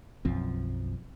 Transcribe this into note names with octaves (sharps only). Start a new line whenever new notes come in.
B1 F#2 F3 C4